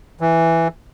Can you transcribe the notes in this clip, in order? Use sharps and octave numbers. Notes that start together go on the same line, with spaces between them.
E3